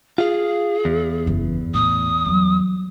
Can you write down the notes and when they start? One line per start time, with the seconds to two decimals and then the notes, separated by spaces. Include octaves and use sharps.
0.18 F4 G#4 F5
0.85 E2
1.26 F#1 E3
1.74 A2 D#6
2.25 F#3 G3